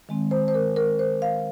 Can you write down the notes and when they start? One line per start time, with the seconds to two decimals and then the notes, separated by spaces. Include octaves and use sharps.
0.09 D#3 G#3 C4
0.31 C5
0.48 C5
0.54 A#4
0.76 A#4
0.99 C5
1.22 F5